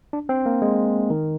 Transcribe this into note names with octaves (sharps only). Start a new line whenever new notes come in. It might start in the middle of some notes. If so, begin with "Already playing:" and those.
D4
C4
A#3
G#3
D#3